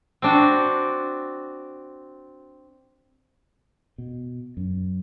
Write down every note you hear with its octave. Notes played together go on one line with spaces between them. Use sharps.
C4 D4 F#4
B2
F#2